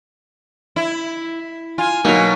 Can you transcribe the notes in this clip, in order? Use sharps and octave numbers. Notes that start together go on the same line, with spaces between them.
E4
F4 G#5
B2 F#3 A#3 D#4 A#4